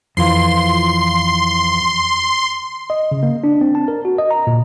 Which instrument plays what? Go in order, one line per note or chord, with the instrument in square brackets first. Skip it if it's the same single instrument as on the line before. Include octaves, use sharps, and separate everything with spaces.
[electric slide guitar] F2 E3 F4 [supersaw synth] C6
[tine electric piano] D#5
C#3
A#3
D4
C4
A5
A#4
F#4
D#5
A#5
A#2